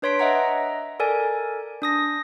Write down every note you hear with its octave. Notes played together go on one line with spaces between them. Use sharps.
D4 B4 C#5 C6 B6 D7
D#5 E5 F#5 A#5
A4 A#4 D5 G#5
D4 D#6 A#6